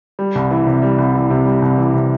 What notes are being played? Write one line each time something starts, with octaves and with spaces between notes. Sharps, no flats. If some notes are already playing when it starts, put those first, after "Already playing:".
G3
C2
E3
C3
G3
C2
E3
C3
G3
C2
E3
C3